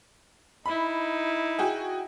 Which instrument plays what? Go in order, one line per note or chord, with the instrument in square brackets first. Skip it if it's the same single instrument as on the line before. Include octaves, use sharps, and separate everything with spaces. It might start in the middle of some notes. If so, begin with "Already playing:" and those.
[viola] D#4 E4 [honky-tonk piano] B5
[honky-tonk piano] F#4 G#4 G5